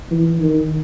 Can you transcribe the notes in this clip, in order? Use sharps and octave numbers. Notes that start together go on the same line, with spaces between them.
E3
D#3